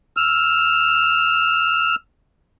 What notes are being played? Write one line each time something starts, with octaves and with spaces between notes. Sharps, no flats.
E6 F6